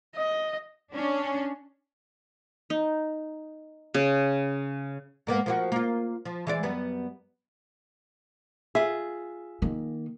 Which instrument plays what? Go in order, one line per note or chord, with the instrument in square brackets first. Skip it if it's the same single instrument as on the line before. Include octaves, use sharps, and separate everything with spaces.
[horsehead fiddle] D#5
[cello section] C#4 D4
[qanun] D#4
C#3
[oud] G#2 A#3 B3
F3 A#3 F#4
A#3 F4
F3
E3 G#3 D5
F#2 G3 B3
[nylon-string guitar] F4 G#4 [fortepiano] E5
[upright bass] D#3 A#3